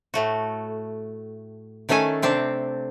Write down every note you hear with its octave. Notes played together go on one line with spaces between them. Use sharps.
A2 A3 F#4
D#3 A3 C#4 A4 G#5
C3 C4 D4 A5